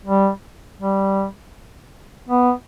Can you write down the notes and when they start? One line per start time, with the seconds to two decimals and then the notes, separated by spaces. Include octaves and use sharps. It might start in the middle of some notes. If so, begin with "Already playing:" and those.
0.06 G3
0.81 G3
2.29 B3